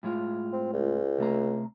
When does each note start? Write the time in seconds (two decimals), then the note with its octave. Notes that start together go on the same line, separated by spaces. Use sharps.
0.03 A2 G#3 F4
0.53 C4
0.73 C#2
1.18 C3 A3 A#5